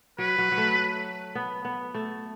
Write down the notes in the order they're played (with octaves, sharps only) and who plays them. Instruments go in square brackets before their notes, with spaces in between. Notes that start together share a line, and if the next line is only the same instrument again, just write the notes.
[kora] F#3 [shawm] B4
[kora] F#3
F#3
A3
B3
B3
A3